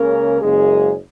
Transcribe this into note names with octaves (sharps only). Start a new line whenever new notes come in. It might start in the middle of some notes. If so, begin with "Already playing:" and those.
Already playing: C#2 C#3 A#3 C#4 A#4
F#1 F#2 C#3 G#3 A#3 G#4